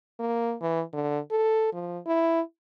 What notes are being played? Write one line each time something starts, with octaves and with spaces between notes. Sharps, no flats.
A#3
E3
D3
A4
F3
E4